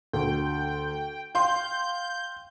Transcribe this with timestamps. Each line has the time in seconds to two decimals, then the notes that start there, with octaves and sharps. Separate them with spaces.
0.13 D2 G5
1.35 F5 G5 C6 G6